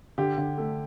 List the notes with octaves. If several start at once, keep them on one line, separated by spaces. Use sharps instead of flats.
D3 G4
D3
A3